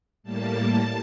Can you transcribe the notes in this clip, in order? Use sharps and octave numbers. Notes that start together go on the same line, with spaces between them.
A2 G3 A#3 A5